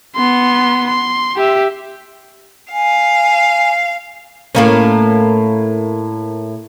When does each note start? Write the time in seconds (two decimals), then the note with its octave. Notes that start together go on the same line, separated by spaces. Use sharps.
0.16 B3 C6
0.88 C6
1.37 G4 E5
2.72 F5 G#5
4.55 A2 A#3 C#4